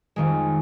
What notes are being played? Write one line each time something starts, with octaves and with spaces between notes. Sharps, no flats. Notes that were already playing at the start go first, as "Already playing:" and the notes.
F2 D#3 G#3